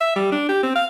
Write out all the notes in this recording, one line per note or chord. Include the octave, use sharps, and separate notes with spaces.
E5
G3
D4
G4
C4
F5